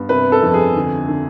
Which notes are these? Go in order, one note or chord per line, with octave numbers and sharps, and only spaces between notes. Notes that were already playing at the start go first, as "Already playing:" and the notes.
Already playing: G2 B3
C3 B4
A4
F2
G#4
D3
D3